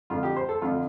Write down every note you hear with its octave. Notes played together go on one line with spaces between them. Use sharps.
F2 D3 F3 F4
G4
C5
A4
F2 D3 F3 F4